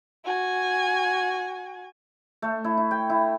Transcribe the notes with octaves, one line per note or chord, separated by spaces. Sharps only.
F#4 G#5
A3
E4
E4
G5
E4